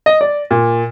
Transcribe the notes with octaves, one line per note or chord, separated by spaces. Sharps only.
D#5
D5
A#2